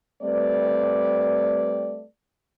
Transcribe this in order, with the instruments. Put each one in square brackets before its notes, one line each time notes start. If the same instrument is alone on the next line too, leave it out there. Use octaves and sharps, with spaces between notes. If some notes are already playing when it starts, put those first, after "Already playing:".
[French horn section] G3 A3 C4 B4 D5